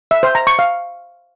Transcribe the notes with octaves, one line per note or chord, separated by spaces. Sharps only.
E5
C5
A#5
C#6
F5